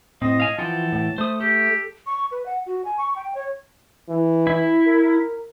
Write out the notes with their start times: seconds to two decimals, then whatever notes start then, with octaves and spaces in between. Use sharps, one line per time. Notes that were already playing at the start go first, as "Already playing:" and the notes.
0.22 A2 C4 D#5
0.40 F5 G#5
0.58 E3 F3 F#5 G5 A5
0.92 A2
1.18 A3 C5 D#6
1.41 G4 A4
2.06 C#6
2.31 B4
2.46 F#5
2.66 F#4
2.85 G#5
2.98 C#6
3.16 G5
3.35 C#5
4.09 E3
4.47 E4
4.87 A#4